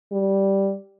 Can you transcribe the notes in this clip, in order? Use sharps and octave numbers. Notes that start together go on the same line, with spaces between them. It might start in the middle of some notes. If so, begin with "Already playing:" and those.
G3